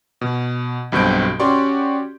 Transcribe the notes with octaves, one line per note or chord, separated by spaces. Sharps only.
B2
B1 G2 B2 C4 G6 D7
C#4 F#4 G4 D5 C6 C#6